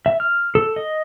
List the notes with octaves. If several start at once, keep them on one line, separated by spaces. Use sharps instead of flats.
E5
F6
A4
D#5